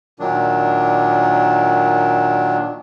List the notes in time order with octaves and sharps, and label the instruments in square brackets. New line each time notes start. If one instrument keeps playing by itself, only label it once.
[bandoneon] A#2 D#3 F#3 D4